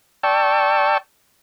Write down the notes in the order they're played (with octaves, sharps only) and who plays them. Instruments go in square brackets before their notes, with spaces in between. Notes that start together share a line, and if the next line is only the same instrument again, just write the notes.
[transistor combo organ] D5 G5 A5 C#6 E6